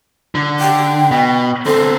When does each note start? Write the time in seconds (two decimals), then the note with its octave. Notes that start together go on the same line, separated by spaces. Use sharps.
0.35 D3
0.60 G5
1.11 B2
1.66 D3 C4 A4